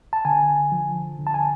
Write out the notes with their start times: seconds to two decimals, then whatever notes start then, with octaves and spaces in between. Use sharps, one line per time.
0.13 A5
0.25 D3 G#5
0.72 F3
1.19 D3
1.27 A5
1.34 G#5